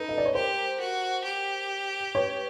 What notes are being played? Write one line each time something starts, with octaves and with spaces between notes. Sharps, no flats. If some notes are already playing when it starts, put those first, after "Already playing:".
Already playing: D#4 A4 B4
D#5
D5
C#5
G4 A#4 C5
F#4
G4
B4 C#5